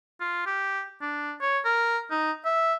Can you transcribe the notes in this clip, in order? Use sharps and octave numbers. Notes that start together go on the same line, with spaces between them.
F4
G4
D4
C#5
A#4
D#4
E5